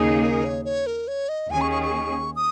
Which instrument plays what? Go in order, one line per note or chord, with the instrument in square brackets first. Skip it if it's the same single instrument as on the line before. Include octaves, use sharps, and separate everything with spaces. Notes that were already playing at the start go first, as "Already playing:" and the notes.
Already playing: [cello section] D#2 C#3 A#3 D#4 G#4
[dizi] A#4
C#5
C#5
A#4
C#5
D#5
[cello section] D#2 D#3 C#4 G#4 [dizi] G#5
[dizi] C#6
C#6
C#6
D#6